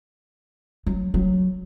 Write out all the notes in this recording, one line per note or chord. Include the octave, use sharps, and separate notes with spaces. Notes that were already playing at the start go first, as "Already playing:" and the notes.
F#3
F#3